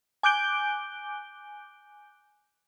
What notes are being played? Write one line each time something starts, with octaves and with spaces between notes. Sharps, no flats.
G#5 D6 F#6 G6 D7 G7